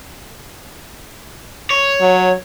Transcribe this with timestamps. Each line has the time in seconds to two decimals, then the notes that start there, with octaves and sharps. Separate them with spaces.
1.70 C#5
2.01 F#3